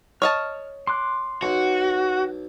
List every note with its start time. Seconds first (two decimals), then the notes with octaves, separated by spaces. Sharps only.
0.22 C#5 D#5 A5 F6
0.87 C6 D6 F#6
1.42 B1 F#4